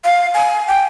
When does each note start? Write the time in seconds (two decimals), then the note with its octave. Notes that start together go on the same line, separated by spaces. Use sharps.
0.04 F5
0.34 G#5
0.68 G5